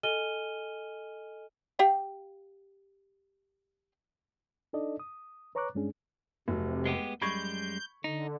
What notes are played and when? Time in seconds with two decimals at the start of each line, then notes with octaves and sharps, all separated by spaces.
0.03 A4 D#5 G#5 F6 D#7 G7
1.79 G4 F5 G5
4.73 D4 D#4 A4 D5 D#5
5.00 D#6
5.55 B4 C#5 A#5 C#6 D6 F#6
5.75 G2 G#3 C#4 D4 G#4
6.48 F1 C3 F#3
6.86 G#3 B3 G4
7.21 F#2 G3 G#3 B5 C#6 G6 G#6
8.04 D3 D#4